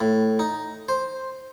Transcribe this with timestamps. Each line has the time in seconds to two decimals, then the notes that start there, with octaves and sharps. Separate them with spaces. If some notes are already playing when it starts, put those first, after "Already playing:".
0.01 A2
0.39 D#4
0.89 C5